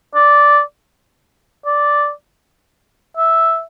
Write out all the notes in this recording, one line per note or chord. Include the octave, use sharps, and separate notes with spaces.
D5
D5
E5